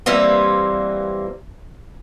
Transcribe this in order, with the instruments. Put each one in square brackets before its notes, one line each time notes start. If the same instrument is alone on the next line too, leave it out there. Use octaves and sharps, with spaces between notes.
[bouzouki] E3 G3 A#3 C4